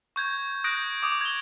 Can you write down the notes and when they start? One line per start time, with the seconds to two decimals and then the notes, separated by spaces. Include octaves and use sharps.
0.16 C#6 G6 G#6
0.64 D#6 F#6 G6 A#6 D7
1.03 D6 D#6
1.21 G#6 G7